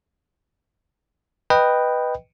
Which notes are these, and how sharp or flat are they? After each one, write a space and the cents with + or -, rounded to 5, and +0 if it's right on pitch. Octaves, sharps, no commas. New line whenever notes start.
B4 +0 D#5 -5 G5 +0